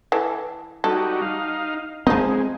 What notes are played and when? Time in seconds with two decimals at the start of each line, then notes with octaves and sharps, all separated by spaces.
0.12 E3 A4
0.84 G3 D#4 F#4 A4
1.22 D#4 F5
2.07 F3 G#3 C4 D#4